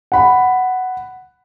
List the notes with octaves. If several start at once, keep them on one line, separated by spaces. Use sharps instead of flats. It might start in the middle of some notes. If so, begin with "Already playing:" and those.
F#5 B5